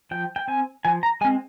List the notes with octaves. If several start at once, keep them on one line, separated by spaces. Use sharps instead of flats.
F3 G5
G5
C4 G#5
F3 G#5
A#5
G#3 C4 G#5